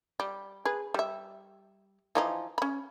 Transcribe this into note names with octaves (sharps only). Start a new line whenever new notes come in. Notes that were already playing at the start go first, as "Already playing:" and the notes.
G3
G#4 B4
G3 E5
E3 F3 D#4
C#4 B5